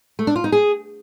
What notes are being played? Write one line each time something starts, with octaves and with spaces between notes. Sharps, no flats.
A3
D4
F4
D#4
G#4